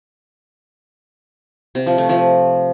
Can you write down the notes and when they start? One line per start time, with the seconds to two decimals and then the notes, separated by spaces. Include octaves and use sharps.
1.75 C3
1.86 F3
1.98 A3
2.09 F3